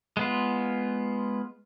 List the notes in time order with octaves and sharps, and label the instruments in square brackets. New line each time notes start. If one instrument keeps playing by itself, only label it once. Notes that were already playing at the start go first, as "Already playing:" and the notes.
[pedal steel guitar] G#3 B3 F4